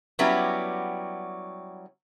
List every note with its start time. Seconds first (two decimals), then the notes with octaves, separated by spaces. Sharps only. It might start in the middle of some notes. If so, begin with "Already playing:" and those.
0.19 F#3 G3 B3 C#4 E4 G4